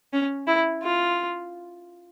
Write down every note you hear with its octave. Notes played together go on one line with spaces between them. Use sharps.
C#4
E4
F4